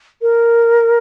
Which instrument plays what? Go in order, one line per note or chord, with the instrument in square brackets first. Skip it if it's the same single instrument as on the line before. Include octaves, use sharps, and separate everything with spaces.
[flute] A#4